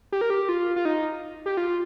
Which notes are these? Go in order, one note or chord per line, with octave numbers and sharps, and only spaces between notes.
G4
A#4
G4
F4
F4
D#4
G4
F4